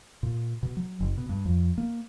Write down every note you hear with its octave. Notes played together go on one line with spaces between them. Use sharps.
A#2
B2
F#3
F#1
B2
G2
F2
A#3